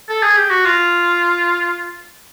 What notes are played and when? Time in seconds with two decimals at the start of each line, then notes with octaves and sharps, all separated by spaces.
0.09 A4
0.23 G#4
0.37 G4
0.50 F#4
0.65 F4